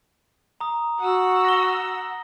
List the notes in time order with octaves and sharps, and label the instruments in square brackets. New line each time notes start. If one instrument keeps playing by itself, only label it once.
[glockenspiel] A#5 D#6
[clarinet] F#4 [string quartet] F#5 E6
[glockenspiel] A#6 G7